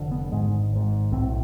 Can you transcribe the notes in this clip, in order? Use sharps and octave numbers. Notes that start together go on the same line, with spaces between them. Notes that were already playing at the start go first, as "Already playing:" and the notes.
Already playing: F1 F2 D3
B3
G#1 G#2 G#3
G#1 G#2
B1 A2 C4